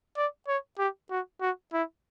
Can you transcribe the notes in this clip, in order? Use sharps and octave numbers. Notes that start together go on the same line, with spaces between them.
D5
C#5
G4
F#4
F#4
E4